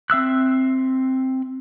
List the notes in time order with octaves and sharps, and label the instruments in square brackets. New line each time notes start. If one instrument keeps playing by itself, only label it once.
[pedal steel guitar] C4 E5 E6 F#6